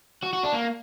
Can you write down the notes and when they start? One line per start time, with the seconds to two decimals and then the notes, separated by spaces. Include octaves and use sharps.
0.23 F#4
0.34 F#4
0.44 D4
0.53 A#3